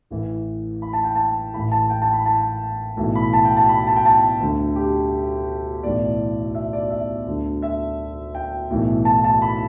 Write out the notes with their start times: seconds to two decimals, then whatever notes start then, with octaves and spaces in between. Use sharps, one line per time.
0.10 A1 A2 E3
0.82 B5
0.93 A5
1.04 G5
1.15 A5
1.53 A1 A2 E3 B5
1.71 A5
1.90 G5
2.02 A5
2.13 B5
2.26 A5
2.97 B1 A2 E3
3.15 B5
3.33 A5
3.44 G5
3.57 A5
3.69 B5
3.87 A5
3.96 G5
4.05 A5
4.41 D2 D3
4.76 G4
5.83 B1 A2 E3 D5
6.55 E5
6.73 D5
6.90 E5
7.27 D2 D3
7.62 E5
8.35 G5
8.70 B1 A2 E3
9.05 A5
9.24 A5
9.42 B5